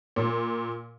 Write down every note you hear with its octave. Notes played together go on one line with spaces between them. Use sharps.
A#2